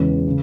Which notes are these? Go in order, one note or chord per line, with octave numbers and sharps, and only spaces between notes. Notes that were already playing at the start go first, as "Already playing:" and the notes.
Already playing: E2 C#3 G#3 C#4
C#3